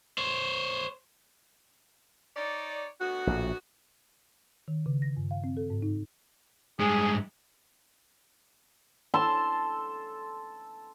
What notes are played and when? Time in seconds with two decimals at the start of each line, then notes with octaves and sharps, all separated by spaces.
0.18 C5 C#5
2.36 D#4 C#5 D5
3.01 D2 B3 F#4
3.27 A#1 A2
4.68 D#3
4.86 C#3
5.02 A#6
5.17 G2
5.31 F5
5.44 C4
5.57 A4
5.70 G#2
5.82 D#4
6.80 G2 G#3 G#4
9.14 A4 A5 C6